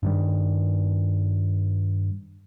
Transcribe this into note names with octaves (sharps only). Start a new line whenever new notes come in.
G2 D#3 G3